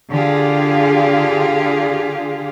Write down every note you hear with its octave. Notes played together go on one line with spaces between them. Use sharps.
D3 F4 G4 G#4 F5